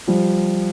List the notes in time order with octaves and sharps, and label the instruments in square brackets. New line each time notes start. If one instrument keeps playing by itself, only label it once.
[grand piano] F3 G3